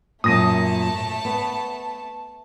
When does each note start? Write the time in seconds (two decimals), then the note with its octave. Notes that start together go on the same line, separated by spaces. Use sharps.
0.24 F#2 A#2 A3 A5 D#6 A#6 D#7
1.25 B3